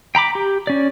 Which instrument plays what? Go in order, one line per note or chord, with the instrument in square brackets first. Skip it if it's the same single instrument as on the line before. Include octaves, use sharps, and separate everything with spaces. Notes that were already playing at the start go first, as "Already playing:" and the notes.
[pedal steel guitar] G5 A#5 B5 D6
G4
C#4 D5